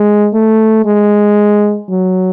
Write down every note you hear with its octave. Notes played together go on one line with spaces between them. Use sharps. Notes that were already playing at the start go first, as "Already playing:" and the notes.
Already playing: G#3
A3
G#3
F#3